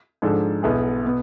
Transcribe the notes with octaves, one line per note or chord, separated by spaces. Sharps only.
G#2 F3 G#3 D4 A4
B1 B2 B3 E4 G#4
B2 B3